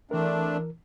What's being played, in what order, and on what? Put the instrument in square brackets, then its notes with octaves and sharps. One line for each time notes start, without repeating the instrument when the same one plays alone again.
[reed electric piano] E3 A#4 [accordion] A3 C4 D4